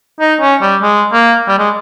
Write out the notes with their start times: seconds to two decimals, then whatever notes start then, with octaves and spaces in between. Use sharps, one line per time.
0.20 D#4
0.41 C#4
0.61 G3
0.82 G#3
1.12 A#3
1.48 G3
1.59 G#3